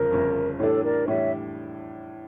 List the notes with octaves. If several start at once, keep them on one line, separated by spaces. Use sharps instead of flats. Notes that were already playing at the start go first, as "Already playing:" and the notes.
Already playing: G1 F2 C#3 A#4
G1 F2 C#3
A2 E3 G3 D4 A4 C#5
C#5
A#4 D5
A2 E3 G3 D4 C#5 E5